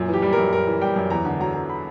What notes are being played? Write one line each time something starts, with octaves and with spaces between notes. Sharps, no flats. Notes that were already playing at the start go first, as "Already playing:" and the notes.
Already playing: F#2 A#2
E3
G4
G3
F#2 A#4
F#2 A#4
E3
G3 G5
F#2
E2 A#5
D3
F#3 A#5
E2
B5